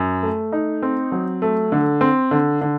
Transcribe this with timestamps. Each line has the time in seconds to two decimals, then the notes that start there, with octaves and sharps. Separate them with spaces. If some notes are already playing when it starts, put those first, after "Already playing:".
Already playing: F#2
0.23 A3
0.52 D#4
0.82 C4
1.12 F#3
1.42 A3
1.72 D3
2.01 C4
2.31 D3
2.61 D3